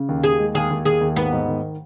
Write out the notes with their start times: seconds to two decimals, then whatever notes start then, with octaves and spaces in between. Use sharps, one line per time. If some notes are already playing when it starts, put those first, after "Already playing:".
Already playing: C#3
0.09 D#2
0.24 D#2 G#4
0.39 G#3
0.55 D#2 G#4
0.71 D#2
0.85 D#2 G#4
1.01 D#2
1.16 G#2 B3
1.32 G#2
1.48 D#3